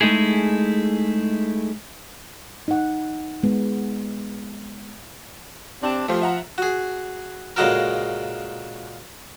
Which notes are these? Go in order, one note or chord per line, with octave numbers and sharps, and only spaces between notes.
G#3 A3 D#4 E4 G#4
D#4 F#5
G#3 B3
C3 C4 D4
F3 A3 G4 C5
E5 F#5 A#5
F#4 G#4
A#2 C#3 G#3 F#4 A4 A#4